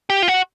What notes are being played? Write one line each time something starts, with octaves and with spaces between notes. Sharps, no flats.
G4
F4
F#4